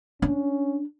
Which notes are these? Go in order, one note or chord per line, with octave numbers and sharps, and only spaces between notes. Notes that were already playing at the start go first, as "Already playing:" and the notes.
C#4 D4